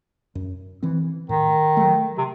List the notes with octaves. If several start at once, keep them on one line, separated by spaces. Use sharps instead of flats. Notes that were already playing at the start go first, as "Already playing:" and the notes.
F#2
E3 C4
A2 D#3
F#3 A3
C3